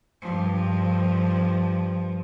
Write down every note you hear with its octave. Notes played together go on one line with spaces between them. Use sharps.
G2 F3